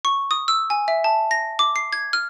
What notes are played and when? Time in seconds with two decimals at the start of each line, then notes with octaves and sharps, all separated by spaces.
0.05 C#6
0.31 D#6
0.48 E6
0.70 G#5
0.88 E5
1.04 A5
1.31 A#6
1.59 D6
1.76 C7
1.93 G#6
2.13 F6